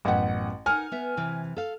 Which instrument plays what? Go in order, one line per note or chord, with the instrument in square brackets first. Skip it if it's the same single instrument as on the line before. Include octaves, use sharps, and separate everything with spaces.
[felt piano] A1 F#5 [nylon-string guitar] F#2 B3
[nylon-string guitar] D#4 A#4 F#5 [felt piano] G#5 F6
[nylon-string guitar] B3 E5
C3 E3
A4 F5